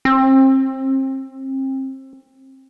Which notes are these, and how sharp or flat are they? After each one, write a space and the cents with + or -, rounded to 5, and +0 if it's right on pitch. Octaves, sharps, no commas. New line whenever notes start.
C4 +30